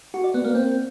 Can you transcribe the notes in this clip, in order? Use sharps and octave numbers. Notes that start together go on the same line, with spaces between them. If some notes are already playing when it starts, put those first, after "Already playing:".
F#4
D5
B3
A#3
C4